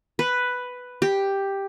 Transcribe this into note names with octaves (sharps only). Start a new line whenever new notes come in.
B4
G4